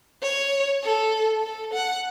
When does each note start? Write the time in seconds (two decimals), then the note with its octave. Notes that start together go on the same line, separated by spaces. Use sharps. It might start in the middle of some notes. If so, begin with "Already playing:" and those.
0.22 C#5
0.83 A4
1.43 A4
1.74 F#5